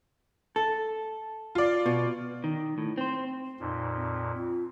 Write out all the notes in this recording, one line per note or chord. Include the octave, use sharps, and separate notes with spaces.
A4
F4 D5
B2
D#3
A2
C4 C5
F2 A#2 D#4
C4
F4